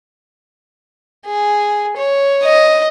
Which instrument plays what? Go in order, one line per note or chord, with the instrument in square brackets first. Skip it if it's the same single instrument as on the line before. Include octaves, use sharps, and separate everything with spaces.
[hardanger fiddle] G#4
C#5
[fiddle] D#5